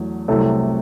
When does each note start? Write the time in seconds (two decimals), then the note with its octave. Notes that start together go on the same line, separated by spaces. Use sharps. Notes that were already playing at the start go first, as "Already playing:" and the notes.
Already playing: E2 F#3 A3
0.28 C2 C3 F#3 A3